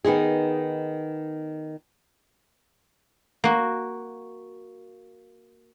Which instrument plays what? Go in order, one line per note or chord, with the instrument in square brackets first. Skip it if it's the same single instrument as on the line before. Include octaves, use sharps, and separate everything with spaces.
[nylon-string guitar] D#3 B3 D#4 G#4
[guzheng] A#3 F#4